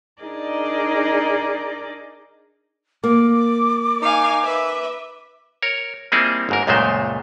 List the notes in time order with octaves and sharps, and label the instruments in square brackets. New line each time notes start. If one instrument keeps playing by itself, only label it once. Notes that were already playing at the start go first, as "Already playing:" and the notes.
[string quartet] D4 D#4 G#4 A#4 D5 D#5
[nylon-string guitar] A#3 [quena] D6
[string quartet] D#4 F5 G#5
B4 E5
[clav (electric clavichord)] A#4 C#5
G3 A#3 C4 D#4 E4 G#4
G1 G#2 A#4
C#2 F#2 A#2 G#3 A3 C5